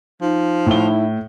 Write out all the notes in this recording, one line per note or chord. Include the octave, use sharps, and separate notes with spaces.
F3 D#4
A2 E4 G7